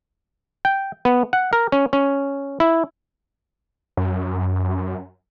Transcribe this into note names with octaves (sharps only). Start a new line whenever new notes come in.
G5
B3
F#5
A#4
C#4
C#4
E4
F#2